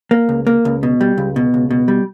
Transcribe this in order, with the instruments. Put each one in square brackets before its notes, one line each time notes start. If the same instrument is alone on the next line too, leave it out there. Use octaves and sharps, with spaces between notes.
[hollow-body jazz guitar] A#3
C#2
A#3
C#2
B2
G3
C#2
B2
C#2
B2
G3